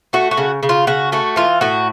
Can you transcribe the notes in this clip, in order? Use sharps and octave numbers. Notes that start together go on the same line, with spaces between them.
A3 F#4
F#4
C#3
C#3
F4
C#3 F#4
A3 F#4
E3 F4
A2 F#4